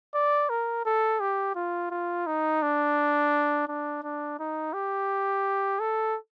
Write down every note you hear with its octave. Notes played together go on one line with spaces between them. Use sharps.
D5
A#4
A4
G4
F4
F4
D#4
D4
D4
D4
D#4
G4
A4